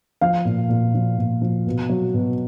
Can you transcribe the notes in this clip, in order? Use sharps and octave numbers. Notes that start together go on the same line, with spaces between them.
F3 F5
A#2
A#2
F3
A#2
F3
B2
F#3
B2